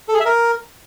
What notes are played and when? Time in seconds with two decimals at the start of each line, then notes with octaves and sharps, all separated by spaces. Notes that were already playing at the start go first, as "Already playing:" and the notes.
0.09 A4
0.14 G#4
0.20 E5
0.26 A#4